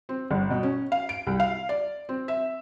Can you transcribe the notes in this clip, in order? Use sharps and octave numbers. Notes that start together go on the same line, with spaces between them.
C4
G1
B2
C#4
F5
D7
C2
F5
D5
C4
E5